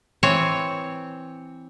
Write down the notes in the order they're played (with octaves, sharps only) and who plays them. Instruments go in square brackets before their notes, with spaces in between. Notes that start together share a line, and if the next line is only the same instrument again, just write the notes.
[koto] E3 C4 C#5